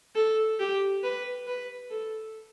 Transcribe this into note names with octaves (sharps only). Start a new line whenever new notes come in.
A4
G4
B4
B4
A4